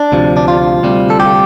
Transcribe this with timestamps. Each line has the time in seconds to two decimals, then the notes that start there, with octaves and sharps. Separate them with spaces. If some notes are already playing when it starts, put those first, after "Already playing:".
Already playing: D4
0.12 D2 C3 F3
0.37 D4
0.48 F4
0.83 D2 C3 G3
1.10 A4
1.20 G4